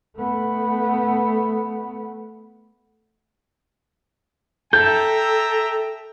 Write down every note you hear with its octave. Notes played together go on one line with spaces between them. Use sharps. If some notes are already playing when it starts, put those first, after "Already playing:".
A3 B3
A4 E5 G5 A#5 G6